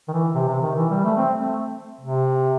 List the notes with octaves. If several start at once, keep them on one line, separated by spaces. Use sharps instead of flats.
D#3
E3
C3
C3
D#3
E3
G3
A3
C4
A3
C3